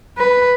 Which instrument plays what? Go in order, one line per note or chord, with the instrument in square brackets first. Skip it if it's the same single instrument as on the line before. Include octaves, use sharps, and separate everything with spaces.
[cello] B4